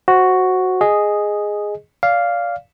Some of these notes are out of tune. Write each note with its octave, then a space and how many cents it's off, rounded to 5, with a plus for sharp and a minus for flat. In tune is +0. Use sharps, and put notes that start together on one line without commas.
F#4 +0 C5 +10
G#4 +0 D#5 -5
D5 -25 F5 +0